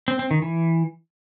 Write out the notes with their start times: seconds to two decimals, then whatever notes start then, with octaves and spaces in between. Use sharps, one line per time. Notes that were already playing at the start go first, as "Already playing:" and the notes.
0.08 C4
0.19 C4
0.31 D#3
0.42 E3